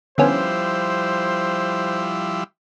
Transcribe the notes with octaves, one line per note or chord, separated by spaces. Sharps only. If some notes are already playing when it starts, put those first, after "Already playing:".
D3 F3 G3 B3 C#4 E4 C5